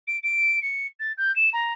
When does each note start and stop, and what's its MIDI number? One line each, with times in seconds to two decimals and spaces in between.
0.07 0.17 98
0.23 0.60 98
0.62 0.87 97
1.00 1.12 93
1.17 1.34 91
1.36 1.50 100
1.53 1.73 82